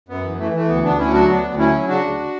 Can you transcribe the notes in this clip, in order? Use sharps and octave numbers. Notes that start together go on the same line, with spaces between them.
F#2 B3
E3
E3 A3
E3 A3
D2 B3
D2 B3 D4
D2 C#4 E4
F#3 D4 F#4
D2 B3 D4
D2
F#3 C#4 E4
F#3
C#3 D4 F#4
D2